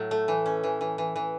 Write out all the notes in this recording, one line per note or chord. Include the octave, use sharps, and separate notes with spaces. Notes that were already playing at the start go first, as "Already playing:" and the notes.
Already playing: A2 F#3
A3
E3
C#4
E3
E3
E3
E3